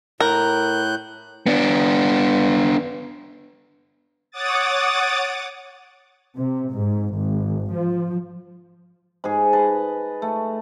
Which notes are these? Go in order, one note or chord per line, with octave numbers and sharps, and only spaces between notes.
A2 A#4 F#6 G6
B3 D4
C#5 F#5 D6 D#6 A6
C3
G#2
G#1
F3
G#2 G#4
B4 D#5 A5
A3